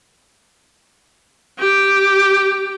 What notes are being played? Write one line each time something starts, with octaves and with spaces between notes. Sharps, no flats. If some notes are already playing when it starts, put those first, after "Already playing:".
G4